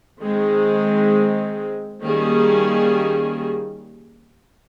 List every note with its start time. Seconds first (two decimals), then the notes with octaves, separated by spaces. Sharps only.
0.21 D#3 G#3 C4
2.00 D#3 G3 A#3 C#4 G#4